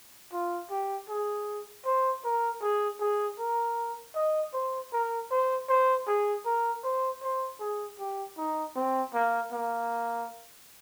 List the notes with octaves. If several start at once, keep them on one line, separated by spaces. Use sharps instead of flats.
F4
G4
G#4
C5
A#4
G#4
G#4
A#4
D#5
C5
A#4
C5
C5
G#4
A#4
C5
C5
G#4
G4
D#4
C4
A#3
A#3